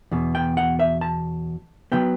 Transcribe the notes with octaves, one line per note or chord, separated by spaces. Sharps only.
E2 B2
G5
F#5
E5
A5
C#3 F#3 B3 G5